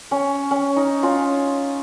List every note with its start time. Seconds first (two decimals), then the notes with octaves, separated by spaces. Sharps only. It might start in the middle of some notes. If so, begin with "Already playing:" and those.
0.11 C#4
0.51 C#4
0.76 D#4
1.03 C#4 F4